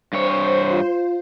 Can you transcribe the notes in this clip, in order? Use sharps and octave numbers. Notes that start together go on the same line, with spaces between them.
G2 C5 C#5
F4